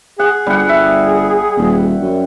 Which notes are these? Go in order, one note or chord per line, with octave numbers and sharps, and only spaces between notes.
G#4 F#5
G1 G3 F#5
E5
D#1
F#2